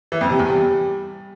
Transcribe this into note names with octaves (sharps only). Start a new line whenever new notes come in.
E3
F2
C3
E2
G3